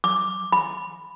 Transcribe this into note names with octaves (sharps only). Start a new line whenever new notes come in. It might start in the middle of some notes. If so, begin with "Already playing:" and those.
D6
B5